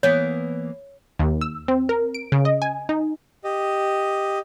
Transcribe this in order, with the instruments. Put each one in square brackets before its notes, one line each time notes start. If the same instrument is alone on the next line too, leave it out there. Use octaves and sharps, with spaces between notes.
[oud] E3 A#3 B3 [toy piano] C#5
[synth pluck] D#2
E6
C4
A#4
D7
C#3
D#5
G#5
D#4
[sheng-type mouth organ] G4 D#5